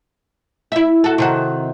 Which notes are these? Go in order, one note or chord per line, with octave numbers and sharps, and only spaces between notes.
E4 E5
F#4 A4
C3 D#3 F#4